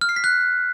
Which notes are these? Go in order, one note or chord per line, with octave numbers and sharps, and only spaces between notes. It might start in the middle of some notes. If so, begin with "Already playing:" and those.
F6
C7
B6
F#6